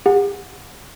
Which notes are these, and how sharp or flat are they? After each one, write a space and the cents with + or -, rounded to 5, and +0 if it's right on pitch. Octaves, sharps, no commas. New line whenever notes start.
G4 +45 F#5 -20